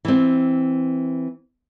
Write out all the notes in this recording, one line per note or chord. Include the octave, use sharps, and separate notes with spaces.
E3 C4